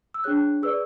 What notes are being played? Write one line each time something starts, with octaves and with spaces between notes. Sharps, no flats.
E6
D4 G#4 C#5 F#6
G#4 B4 D5 E6